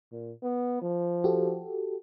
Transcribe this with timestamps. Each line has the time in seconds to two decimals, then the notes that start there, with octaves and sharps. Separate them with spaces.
0.12 A#2
0.43 B3
0.82 F3
1.24 F#4 G4 A4